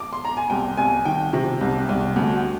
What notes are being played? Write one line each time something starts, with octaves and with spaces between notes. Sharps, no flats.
D6
C6
A#5
G#5
C2 G5
C2 G#5
D#3 G5
C3
C2
C2
D2